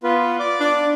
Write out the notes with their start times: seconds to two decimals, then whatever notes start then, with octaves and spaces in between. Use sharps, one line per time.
0.03 B3 F4 B4
0.39 D5 D6
0.60 D4